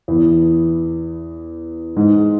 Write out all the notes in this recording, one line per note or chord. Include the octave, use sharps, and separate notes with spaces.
E2 E3
G#2 G#3